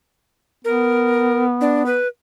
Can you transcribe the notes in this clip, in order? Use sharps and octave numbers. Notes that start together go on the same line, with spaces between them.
B3 A#4
D4
B4